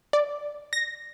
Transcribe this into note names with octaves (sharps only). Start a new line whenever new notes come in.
D5
A#6